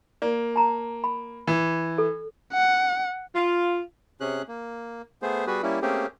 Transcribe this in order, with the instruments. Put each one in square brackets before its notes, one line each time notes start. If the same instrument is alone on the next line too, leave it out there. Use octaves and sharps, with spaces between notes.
[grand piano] A#3 [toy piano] D5
[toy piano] A5 A#5
B5
[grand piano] E3
[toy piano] A4
[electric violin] F#5
[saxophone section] F4
[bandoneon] C3 C#4 G#4 F#6
A#3
A3 B3 G#4 C5
G3 B3 F#4 G#4 B4
G3 A#3 C#4 E4
A3 A#3 C4 C#4 G4 G#4